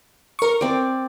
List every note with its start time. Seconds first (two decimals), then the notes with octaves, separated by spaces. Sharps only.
0.39 A#4 C#6
0.61 C4 D5